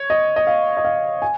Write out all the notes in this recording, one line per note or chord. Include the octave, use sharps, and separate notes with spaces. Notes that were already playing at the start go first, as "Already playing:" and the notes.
Already playing: C#5
D#5
D#5
F5
D#5
F5
G#5